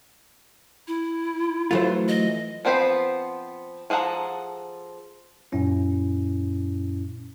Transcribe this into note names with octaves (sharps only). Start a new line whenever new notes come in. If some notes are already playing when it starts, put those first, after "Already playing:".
E4
E3 F#3 A3 F4 B4 C5
D#5
F3 B3 C4 C5 B5
F3 G#4 A4 F#5 A#5
F#2 A#2 C#4 E4